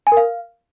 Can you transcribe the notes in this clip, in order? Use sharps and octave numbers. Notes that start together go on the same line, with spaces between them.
G#5
A#4
F5